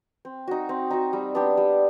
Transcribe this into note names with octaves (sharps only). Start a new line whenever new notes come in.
C4
D#4 F#4
C4
D#4 F#4
G3
B3 D4 G4
G3